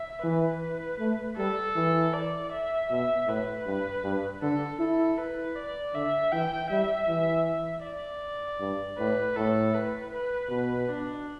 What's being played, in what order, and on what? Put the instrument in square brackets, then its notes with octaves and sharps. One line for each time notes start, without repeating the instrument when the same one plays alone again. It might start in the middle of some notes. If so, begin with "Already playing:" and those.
Already playing: [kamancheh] E5
[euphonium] E3 [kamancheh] B4
[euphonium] A3
[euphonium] G3 [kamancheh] A4
[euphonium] E3
[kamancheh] D5
E5
[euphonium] B2 [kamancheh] E5
[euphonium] A2 [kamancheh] B4
[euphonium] G2
G2
[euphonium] D3 [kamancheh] A4
[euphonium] E4 [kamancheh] A4
[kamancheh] B4
D5
[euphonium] D3 [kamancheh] E5
[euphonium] E3 [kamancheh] G5
[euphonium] G3 [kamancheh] E5
[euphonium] E3
[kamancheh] E5
D5
[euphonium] G2
[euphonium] A2 [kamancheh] B4
[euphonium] A2 [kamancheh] A4
[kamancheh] B4
B4
[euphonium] B2 [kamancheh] B4
[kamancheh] D4